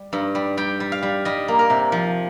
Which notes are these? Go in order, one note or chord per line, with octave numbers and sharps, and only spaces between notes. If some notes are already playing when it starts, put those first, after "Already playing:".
Already playing: G3
G2
G3
G3 G5
G3
F5
G3
G3 D#5
A#3
A#4
C3
F3